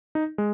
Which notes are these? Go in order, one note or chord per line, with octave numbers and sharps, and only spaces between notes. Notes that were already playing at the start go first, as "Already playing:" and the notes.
D#4
G#3